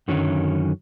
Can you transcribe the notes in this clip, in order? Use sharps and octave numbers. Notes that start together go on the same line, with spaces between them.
F#2 D3 D#3 F#3 C#4